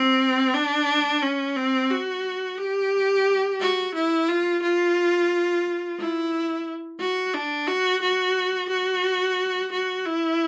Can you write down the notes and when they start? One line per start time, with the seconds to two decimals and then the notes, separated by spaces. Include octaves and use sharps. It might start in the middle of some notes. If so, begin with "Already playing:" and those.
Already playing: C4
0.54 D4
1.22 C#4
1.56 C4
1.91 F#4
2.59 G4
3.60 F#4
3.94 E4
4.28 F4
4.62 F4
5.99 E4
7.00 F#4
7.34 D4
7.68 F#4
8.02 F#4
8.70 F#4
9.72 F#4
10.05 E4